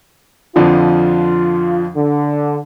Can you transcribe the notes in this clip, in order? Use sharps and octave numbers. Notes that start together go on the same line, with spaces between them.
F2 D3 F3 F4
D3